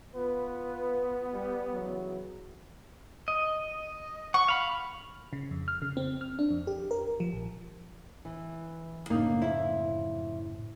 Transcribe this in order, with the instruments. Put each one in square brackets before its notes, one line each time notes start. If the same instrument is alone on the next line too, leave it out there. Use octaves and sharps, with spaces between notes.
[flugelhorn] B3 [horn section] F4 B4
[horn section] G3
C#3 E3 F#3
[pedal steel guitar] D#5
[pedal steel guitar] F#5 [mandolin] C#6
[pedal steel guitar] F5 B5
[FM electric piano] C#3
F2
F6
C#3
C4
F6
D4
F2
G4
A#4
F3
A#1
[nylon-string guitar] E3
[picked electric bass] F#2 A2 C#3 [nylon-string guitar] A#3 D4 D#4
[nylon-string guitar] F2 E4 E5